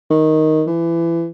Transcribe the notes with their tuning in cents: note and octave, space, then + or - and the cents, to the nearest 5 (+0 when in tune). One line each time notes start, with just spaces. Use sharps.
D#3 +5
E3 +25